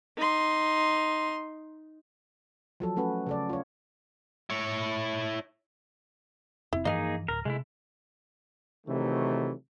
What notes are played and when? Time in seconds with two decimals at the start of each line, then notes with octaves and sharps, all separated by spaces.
0.17 D#4 C6
2.80 F3 F#3 A4
2.97 A3 C#4 F#4 B4
3.27 C#3 A4 D5
3.49 F4 C#5
4.50 E4 C#5
6.73 F1 C4 E4
6.85 G2 E3 F3 A#3 D#4 G#4 D#5 F5
7.28 D1 A#4
7.45 C3 G#3 A3 E4
8.87 C3 D#3 E3 F#3 A3